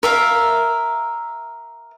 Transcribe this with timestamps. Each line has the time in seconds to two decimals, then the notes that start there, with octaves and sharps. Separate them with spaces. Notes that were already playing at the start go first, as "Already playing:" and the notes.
0.03 A#4 E5 F5